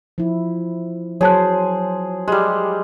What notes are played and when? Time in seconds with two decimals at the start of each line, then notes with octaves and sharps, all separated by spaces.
0.18 F3 E4
1.21 F#3 G#4 C5 C#5 A5 F#6
2.28 G3 G#3 G4